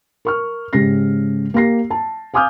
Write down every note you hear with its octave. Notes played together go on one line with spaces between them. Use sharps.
A#4 C#6 F6
G#2 C#3 G4 A#6 C7
A#3 G4 A#6 C7
A5
F5 G#5 D6 D#6 F6 G6